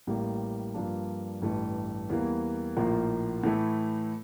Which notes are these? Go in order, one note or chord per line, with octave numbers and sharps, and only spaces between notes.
A1 A2 G3 A#3
G2 F3 A#3 D4
A1 G2 E3 A3
E2 E3 G3 A#3
A#1 A2 F3 A#3 F4
A2 E3 A3 E4